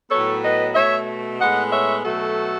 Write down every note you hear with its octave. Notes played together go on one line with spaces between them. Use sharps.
A2 F#3 B3 A4 C#5
B4 D#5
B2 A3 C#5 E5
A2 G#3 B3 D#5 F#5
C#5 E5
B2 F#3 A3 F#4 A4